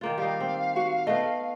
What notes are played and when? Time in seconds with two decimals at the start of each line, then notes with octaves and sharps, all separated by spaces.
0.01 D#3 A#3 F4
0.18 G3 D#4 F5
0.40 C4
0.76 F#4
1.07 A3 B3 D#5